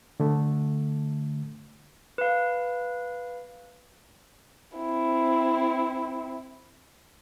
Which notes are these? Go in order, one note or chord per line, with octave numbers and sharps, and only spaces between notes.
D3 A3
B4 F5
C4 E4